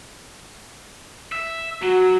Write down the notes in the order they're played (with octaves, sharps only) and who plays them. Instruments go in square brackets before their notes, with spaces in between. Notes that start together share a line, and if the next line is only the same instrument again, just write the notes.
[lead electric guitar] E5
[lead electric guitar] F#3 [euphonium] F#4